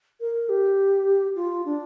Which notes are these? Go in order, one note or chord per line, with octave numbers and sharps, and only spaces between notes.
A#4
G4
F4
D4